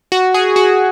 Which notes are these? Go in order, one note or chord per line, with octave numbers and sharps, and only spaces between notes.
F#4
G#4
F#4